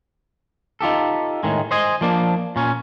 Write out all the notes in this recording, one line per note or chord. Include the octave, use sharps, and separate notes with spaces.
D#4 F4 G4 A4
A2 D#3 G#3
C5 D#5 G#5
F3 A#3 D4
A#2 C#4